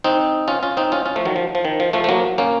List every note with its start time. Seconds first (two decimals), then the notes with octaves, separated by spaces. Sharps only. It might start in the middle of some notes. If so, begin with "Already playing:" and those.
0.04 C4 D#4
0.48 C#4 F4
0.63 C#4 F4
0.77 C4 D#4
0.92 C#4 F4
1.06 C#4 F4
1.16 F3 A3
1.25 D#3 F#3
1.36 F3
1.55 F3
1.65 D#3
1.80 F3
1.93 F3 A3
2.04 A3
2.09 F#3 A#3
2.38 A#3 C#4